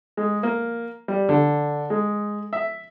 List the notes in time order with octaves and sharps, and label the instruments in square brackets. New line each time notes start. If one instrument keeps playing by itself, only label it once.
[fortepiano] G#3
A#3
G3
D3
G#3
E5